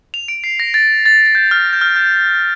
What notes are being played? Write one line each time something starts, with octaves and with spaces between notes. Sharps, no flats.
F7
D7
C7
A#6
A6
A6
A6
G6
F6
G6
F6
G6